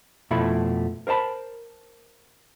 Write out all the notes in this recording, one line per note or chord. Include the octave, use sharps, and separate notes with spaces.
F2 B2 F3 A3 E4 B5
A#4 C5 D#5 A5 B5